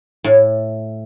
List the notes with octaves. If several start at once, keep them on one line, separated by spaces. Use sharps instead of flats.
A2